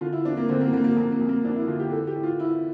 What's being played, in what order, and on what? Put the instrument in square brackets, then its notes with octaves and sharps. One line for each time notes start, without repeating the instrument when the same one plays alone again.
[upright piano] D3 F4
E4
E2 D4
A#3
D3 C4
A#3
D3 A#3
A#3
F2 A#3
A#3
F2
A#3
F2 D4
E4
D3 F4
G4
E3 A4
G4
A2
F4
E3 E4